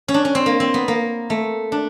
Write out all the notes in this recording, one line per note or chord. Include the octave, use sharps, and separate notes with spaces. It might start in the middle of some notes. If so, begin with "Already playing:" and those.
C#4
D4
C#4
C4
A#3
C4
B3
A#3
A3
D4